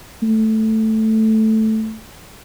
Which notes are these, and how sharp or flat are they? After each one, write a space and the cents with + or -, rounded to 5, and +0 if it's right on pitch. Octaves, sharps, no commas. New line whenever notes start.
A3 +0